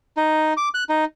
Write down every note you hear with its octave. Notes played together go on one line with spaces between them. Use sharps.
D#4
D6
F#6
D#4